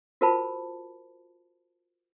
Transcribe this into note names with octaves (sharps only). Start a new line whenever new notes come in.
F4 F#4 A#4 C5 A5 B5